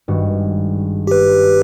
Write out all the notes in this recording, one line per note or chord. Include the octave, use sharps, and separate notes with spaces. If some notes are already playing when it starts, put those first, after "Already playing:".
G#1 G2 F#4
G4 B4